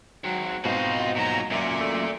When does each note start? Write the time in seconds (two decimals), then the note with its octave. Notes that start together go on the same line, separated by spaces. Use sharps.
0.24 G#2 F#3 C4
0.65 G#2 B2 C4 D#4 F4 F#4
1.17 A#2 F#3 D#4 A#5
1.51 F#2 A#2 A#3 D5 E5
1.81 A3